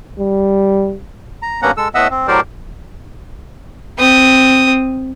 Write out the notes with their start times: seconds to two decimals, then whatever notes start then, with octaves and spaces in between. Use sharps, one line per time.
0.19 G3
1.42 A#5
1.62 G2 A#3 B3 C#4 F#5 A#5
1.77 G#3 A4 E6
1.95 A2 B3 D#5 E5 F#5 E6
2.10 C4
2.28 A2 F#3 G4 A#4 C5 D5
3.98 C4 D#6